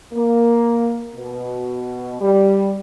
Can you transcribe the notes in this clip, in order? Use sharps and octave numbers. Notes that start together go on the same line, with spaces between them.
A#3
B2
G3